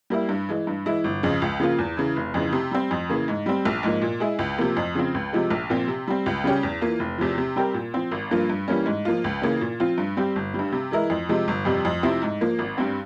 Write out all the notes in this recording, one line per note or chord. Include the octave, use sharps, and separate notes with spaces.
G3 A#3 E4
G2
E3 G#3
G2
E3 G#3 E4
G1
F2 C#3 F3
C#2
C#3 F3 A#3 F4
E2
C#3 E3
F1
F2 C#3 E3
C3
G3 C4
F2
C#3 E3 A#3
G#2
G3 C4
A#1
G#2 F3 A#3
A#2
G#3 E4 G#4
C#2
C3 F3 A#3
F2
C#3 F3 C4
C#2
C3 F3 G#3
A#1
A#2 F3 C4
C3
G3 C4
C#2
C#3 G3 C#4 G4
E2
E3 A#3 F4
F1
E2 C3 F3
C3
G3 C4 G4 A#4
A#2
F3 C4
G#1
G2 F3 A#3 F4
G2
E3 G3 A#3 C#4
G#2
F3 A#3 F4
C#2
C#3 E3 A#3 C#4
A#2
F3 C4 F4
G2
G3 C4 G4
G1
G3
G2
C3
E3 G#3 E4 A#4
F2
C3 F3 G#3
G1
F2 C3 G3
F2
C3 F3 C4 E4
G#2
F3 A#3
G#1
G2 G3 C4